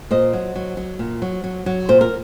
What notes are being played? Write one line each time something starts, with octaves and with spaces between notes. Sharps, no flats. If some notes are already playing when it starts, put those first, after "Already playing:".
A#2 C5 D#5
F#3
F#3
F#3
A#2
F#3
F#3
F#3
A#2 C5
A#4